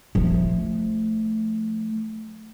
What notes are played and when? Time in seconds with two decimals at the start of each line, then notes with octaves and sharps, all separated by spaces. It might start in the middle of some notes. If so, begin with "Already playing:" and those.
0.15 F3 A3